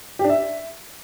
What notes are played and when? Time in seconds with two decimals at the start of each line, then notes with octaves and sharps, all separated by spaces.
0.19 G4
0.24 D4
0.29 E5